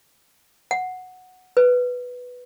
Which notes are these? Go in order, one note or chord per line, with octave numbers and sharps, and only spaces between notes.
F#5
B4